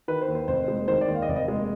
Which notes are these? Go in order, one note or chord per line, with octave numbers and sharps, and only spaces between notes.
D#3 B4
C5
D#2
C5
F1 C5
G#3
D#3 C5
D5
D#2
F5
D#5
F1 D5
D#5
G#3